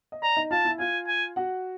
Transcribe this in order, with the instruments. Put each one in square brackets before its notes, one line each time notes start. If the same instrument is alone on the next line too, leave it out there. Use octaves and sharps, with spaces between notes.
[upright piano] D#5
[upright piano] D5 [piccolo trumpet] A#5
[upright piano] D#4 D#5
[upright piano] F4 F5 [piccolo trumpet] A5
[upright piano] E4 E5
[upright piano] F4 F5 [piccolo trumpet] G#5
[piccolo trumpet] G#5
[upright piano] F#4 F#5